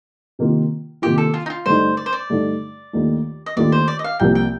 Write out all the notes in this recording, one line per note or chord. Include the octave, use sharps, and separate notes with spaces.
C3 D#3 A#3 F4
C3 D#3 A#3 F4 G4
A4
F4
D#4
F4
G2 D3 A3 D#4 C5
D5
C5
D5
G2 D3 A3 D#4
D#2 D#3 A3 D4 F4
D#5
D#2 D#3 A3 D4 F4 D5
C5
D5
D#5
F5
C2 C3 F3 A#3 G5
G5